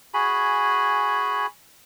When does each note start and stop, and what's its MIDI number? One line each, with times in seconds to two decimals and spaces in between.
0.14 1.46 66
0.14 1.46 68
0.14 1.46 80
0.14 1.46 83